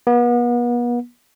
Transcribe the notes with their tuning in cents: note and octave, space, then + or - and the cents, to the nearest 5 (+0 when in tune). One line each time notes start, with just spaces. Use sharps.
B3 -40